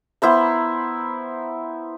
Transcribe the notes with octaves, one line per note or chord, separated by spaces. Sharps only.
B3 E4 C5 A#5